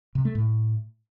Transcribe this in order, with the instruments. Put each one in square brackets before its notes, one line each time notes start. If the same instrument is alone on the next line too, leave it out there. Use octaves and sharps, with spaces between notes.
[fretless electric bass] C3
A3
A2